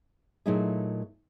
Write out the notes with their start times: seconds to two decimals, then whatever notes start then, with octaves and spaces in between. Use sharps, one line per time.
0.46 A#2 F#3 A3 D#4 E4 G#4